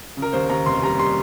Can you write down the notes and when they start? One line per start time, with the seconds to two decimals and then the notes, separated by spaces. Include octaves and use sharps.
0.17 C#3
0.22 A#4
0.33 D#2 C5
0.49 D#2 A#5
0.66 F1 C6
0.83 G3 A#5
0.99 G3 C6